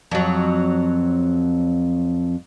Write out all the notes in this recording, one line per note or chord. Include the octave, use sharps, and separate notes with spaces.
F2 F#3